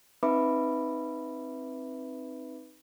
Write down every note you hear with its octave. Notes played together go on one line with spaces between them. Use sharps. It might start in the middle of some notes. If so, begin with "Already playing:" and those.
C4 D#4 B4 E5 B5 D6